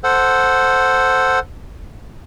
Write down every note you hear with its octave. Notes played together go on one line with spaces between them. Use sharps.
A4 C5 F#5